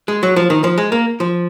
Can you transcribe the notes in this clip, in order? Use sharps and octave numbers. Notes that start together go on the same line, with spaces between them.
G#3
F#3
F3
D#3
F3
G#3
A#3
F3